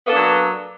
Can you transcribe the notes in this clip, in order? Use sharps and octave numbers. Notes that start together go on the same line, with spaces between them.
F#3 A#3 B3 D4 A4